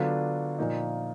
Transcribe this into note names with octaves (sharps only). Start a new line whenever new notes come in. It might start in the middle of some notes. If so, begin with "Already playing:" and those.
Already playing: D3 F#3 B3 D4 F4
A#2 F3 A#3 D#4